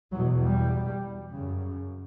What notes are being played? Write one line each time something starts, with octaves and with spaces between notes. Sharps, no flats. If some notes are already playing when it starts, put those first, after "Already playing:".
E2 B2 F#3
G3
F#2 C#3